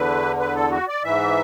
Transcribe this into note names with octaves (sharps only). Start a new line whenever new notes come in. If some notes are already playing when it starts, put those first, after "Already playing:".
Already playing: E2 D3 B4
B4
A4
F#4
D5
G#2 E3 E5